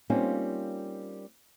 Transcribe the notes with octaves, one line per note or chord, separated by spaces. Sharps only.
G3 A#3 C4 C#4 D#4 F4